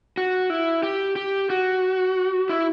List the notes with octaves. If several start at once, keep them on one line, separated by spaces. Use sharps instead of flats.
F#4
E4
G4
G4
F#4
E4